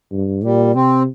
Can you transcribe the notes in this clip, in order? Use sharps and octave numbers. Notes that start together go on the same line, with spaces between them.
G2
A#2 G3
C3 C4